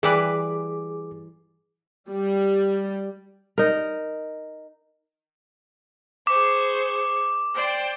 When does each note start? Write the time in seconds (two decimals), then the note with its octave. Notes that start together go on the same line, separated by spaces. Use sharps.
0.03 E3 G3 G#4 B4 D6
2.10 G3
3.58 D#4 A#4
6.27 G#4 C5 C#6 D6
7.55 C5 D5 G5